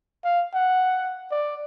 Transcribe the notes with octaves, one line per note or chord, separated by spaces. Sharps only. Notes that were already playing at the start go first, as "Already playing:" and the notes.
F5
F#5
D5